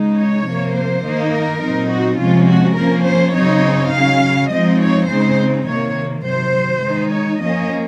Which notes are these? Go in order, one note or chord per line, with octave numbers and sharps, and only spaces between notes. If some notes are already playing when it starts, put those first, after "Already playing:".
Already playing: C#3 G#3 D#4
C#5
C3 F3 A#3
C5
D#3 A#3 D#4
A#4
A#2 F#3 C4 D#4
F#4
C3 F3 G#3 C#4 F4
F#4
F3 A#3 C#4 A#4
C5
C#3 F#3 C4 D#4 C#5
C#3 F#3 C#4 F5
F3 G#3 C4 D#4 D#5
C#5
C#3 G#3 C4 D#4 C5
C3 D#3 A#3 C#5
C3 D#3 F#3 C5
D#3 G#3 D#4
C#5
F3 A#3 C#4 D#5